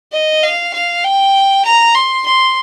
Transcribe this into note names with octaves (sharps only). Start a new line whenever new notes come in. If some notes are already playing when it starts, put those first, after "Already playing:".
D#5
F5
F5
G5
A#5
C6
C6